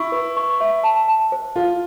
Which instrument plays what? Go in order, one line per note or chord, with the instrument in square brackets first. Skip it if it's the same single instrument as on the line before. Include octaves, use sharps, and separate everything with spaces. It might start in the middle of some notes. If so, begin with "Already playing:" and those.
Already playing: [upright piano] E4 [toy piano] C#6
[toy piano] B4
C#6
E5
A5
A5
C5
[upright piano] F4 [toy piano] A4